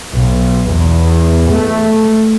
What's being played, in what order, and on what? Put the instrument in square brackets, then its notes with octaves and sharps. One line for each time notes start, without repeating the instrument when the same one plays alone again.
[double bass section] B1
E2
A3